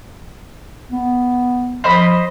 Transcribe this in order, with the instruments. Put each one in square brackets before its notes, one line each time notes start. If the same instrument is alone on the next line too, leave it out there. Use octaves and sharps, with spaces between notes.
[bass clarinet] B3
[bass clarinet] F3 [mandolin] C5 D#5 B5